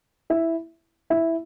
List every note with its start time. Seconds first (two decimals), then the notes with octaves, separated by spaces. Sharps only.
0.30 E4 E5
1.10 E4 E5